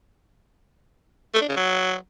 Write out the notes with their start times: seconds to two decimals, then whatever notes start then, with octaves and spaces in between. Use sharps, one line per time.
1.34 A3
1.41 D4
1.49 C#3
1.56 F#3